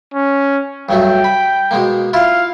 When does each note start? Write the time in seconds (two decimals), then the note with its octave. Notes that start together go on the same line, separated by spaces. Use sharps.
0.14 C#4
0.89 G2 F#3 A3 G5
1.24 B5
1.71 B2 G#3 A#3
2.13 E4 F4 F5